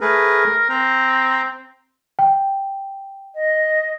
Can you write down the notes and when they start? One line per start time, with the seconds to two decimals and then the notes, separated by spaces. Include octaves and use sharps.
0.01 A3 G#4 A#4 B4
0.70 C4 A#5
2.19 G5
3.34 D#5